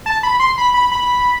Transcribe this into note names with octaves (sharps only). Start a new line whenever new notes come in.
A5
B5
C6
B5
B5
B5